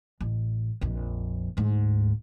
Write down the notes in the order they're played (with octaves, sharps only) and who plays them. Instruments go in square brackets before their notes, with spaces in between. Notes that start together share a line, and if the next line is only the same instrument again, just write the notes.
[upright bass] A1
A#1 F2
D2 G#2